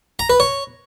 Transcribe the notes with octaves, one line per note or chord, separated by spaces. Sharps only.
A#5
B4
C#5